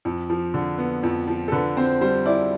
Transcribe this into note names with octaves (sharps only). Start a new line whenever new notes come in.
F2
F3
D3
B3
F2
F3
A4
D3 B4
C4 C5
G3 C5
E4 D5